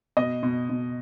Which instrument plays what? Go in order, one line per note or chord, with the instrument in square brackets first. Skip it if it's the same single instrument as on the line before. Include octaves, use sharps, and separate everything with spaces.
[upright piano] B2 D#5
B2
B2